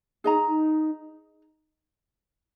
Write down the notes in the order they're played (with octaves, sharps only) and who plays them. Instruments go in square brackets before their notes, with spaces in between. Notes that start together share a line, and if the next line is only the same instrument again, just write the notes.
[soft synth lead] D#4 [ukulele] G#4 D#5 A#5
[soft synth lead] D#4